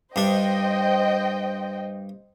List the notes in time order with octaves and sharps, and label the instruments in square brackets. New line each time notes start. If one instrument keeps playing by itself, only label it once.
[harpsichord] G2 D4 [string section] C5 D#5 G5